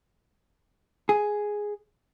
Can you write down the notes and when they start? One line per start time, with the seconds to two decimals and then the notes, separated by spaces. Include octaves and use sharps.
1.09 G#4